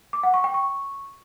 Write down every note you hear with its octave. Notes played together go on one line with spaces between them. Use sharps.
D6
F#5
C#6
G5
C#6